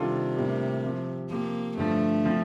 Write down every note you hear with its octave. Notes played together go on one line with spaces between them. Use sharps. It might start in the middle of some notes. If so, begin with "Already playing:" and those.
Already playing: C3 D#3 G3 D4 F4 A4
A2 G3 A#3 D4 G4
F3 C4 G4
F3 A#3 C4 G4
G2 D3 F3 A3
F3 C4